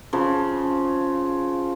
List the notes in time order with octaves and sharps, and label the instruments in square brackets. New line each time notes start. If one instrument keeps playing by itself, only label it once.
[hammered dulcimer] C#3 F3